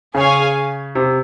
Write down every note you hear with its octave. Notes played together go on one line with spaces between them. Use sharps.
C#3 G#4 C#5 F5 G#5
C3